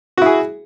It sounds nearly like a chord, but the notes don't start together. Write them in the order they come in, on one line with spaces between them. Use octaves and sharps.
F#4 E4 G#4